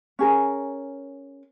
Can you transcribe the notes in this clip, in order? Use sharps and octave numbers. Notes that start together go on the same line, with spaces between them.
C#4 G#4 A#4